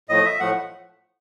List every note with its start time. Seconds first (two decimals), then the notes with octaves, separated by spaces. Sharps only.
0.09 A2 F3 A3 D#5
0.25 E5
0.40 A2 F3 A3 F#5